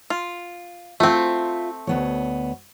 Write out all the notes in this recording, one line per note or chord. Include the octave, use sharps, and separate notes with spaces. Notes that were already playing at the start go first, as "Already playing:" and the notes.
F4
A3 C4 F4 E5
D2 B3 C#5